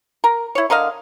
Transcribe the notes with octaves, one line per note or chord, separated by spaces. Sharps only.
A#4
E4 C#5
D3 A#4 D#5 F5